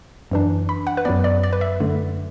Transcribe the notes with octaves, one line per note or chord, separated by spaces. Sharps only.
F#2 E3 D4
B5
F#5
B4
F#2 F#3 B3 D5
D5
D5
B4
E5
F#2 D3 A3